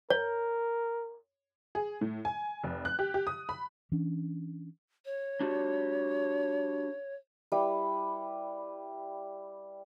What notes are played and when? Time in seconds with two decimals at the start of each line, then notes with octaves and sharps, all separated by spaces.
0.10 A#4 C#5
1.75 G#4
2.01 A2
2.25 G#5
2.64 F1
2.85 F#6
2.99 G4
3.14 G4
3.27 D#6
3.49 B5
3.92 E3 C#4 D4
5.05 C#5
5.41 D4 F#4 G4
7.52 G3 E4 B4